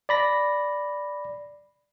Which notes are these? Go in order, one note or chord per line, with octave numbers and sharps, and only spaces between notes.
D5 B5 A#6